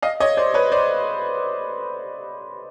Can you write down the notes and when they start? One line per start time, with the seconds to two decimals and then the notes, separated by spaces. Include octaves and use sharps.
0.02 D#5 F5
0.20 C#5 D#5
0.37 C5 D5
0.54 B4 C#5
0.72 C5 D5